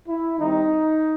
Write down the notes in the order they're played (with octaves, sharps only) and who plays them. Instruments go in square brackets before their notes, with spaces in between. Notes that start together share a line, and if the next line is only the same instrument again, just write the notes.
[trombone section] E4
D#3 G3 C4 D#4